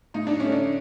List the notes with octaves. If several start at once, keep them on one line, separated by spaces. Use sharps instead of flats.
A2 D#4
D4
A3 C#4
D4